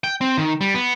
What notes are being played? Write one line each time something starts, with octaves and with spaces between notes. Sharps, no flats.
G5
C4
D#3
G3
B3